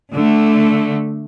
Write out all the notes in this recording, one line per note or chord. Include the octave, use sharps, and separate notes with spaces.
D3 A3